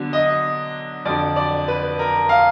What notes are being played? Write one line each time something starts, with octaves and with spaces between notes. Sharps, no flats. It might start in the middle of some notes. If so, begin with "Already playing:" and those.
Already playing: D3 F#3 B3 D4
D#5
F2 D3 F#3 D5
D5
B4
A#4
F5